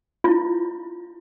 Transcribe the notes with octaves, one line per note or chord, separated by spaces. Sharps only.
E4 F4